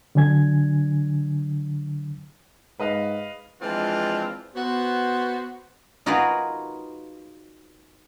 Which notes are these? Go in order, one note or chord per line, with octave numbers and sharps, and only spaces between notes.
D3 F#3 D4 G#5 G#6
G#2 B4 D#5 F5
E3 F3 G#3 C4 D4 F4
B3 F#4 C5
D#4 F4 F#4 G#4 A#4 B4